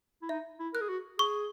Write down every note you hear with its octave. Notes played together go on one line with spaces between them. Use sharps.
E4
D#4 E5
E4
A#4 F#6
G#4
F#4
G#4 C#6